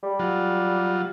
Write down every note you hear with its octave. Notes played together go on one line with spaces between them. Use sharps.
G3
F#3 F4